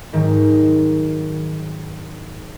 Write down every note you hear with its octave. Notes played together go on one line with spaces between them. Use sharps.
G#2 D#3 F#3